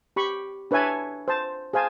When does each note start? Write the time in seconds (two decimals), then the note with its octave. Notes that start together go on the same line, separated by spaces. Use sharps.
0.16 G4 B5 C#6
0.71 D4 B4 C#5 E5 G#5 A5
1.28 C5 A5
1.73 G#4 C5 F5 G#5 A5